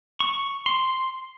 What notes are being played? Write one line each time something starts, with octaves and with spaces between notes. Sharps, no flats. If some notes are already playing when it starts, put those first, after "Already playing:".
C#6
C6